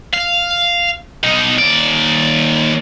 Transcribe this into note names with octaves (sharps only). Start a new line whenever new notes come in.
F5
B2 D#4
D#2 D5